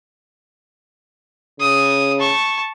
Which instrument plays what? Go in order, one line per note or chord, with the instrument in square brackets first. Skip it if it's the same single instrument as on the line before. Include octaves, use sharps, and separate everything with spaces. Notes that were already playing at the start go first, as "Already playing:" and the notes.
[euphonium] C#3 [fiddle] D#6
[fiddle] A5 C#6